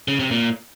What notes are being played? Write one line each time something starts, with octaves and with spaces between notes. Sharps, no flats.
C#3
C3
A#2